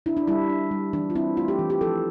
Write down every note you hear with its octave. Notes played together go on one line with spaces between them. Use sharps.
D4 E4
D4
G3 E4
D4
G3
E3 D4
F4
C4 E4
A3 F4
G4
E3
G4
F3 A4